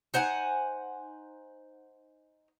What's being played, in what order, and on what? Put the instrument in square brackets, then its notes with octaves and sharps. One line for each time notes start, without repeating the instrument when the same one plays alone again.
[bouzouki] D#4 C5 F#5 G#5